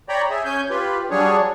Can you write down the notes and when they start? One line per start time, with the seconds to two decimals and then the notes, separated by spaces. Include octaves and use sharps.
0.09 C#5 D5 G5 A#5 B5
0.30 G#4 E5
0.45 C#4 G#5 G6
0.70 F4 G4 B4
1.11 F#3 G3 D4 G#4 C#5